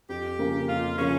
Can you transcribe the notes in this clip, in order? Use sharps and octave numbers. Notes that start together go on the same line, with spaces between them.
F2 G4
C#3 F3 A#3
F2 F4
C#3 F3 A#3 C#4